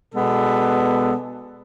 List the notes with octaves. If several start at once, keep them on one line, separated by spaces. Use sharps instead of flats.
B2 G#3 B3 D4 A4